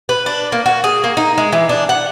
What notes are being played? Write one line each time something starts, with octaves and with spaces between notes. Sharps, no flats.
B4
D4
A#3
F#4
G#4
A#3
D#4
G#3
E3
D4
F#5